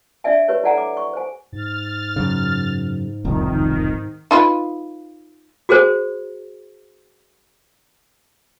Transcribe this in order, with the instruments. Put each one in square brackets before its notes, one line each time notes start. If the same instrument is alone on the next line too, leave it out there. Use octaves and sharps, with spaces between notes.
[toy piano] D4 D5 E5 G#5
G4 B4 C#5
E4 A4 D5 F#5 G#5 A#5
D6
C#6
C5 G#5
[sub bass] G#2 [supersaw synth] F6 A6
[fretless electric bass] F#2 C#3
[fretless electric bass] E1 C2 F2 [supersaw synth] D#3
[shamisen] D#4 F4 B4
[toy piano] F#4 G#4 A#4 C5